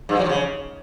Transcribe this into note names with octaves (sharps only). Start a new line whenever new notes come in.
G2
G#3
F#3
F3
C#3